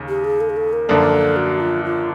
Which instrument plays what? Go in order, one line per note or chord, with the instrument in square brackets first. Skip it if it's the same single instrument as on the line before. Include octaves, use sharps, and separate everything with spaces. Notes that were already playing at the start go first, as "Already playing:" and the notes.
Already playing: [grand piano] D#2 C#3
[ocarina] G4
G#4
A4
G#4
A4
A#4
[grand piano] F#2 D3 F3 A#3 D4 [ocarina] A4
[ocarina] F#4
F4
F4